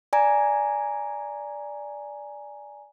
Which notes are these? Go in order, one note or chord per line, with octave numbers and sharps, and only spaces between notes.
D5 G#5 A#5